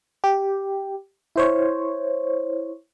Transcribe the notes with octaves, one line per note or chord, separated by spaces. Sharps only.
G4
E4 C5 C#5